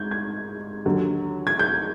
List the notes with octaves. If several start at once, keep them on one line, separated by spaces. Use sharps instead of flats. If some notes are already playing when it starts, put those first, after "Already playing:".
Already playing: G#2 G6 G#6
G#6
D#2 D3 F#3
G#6
G6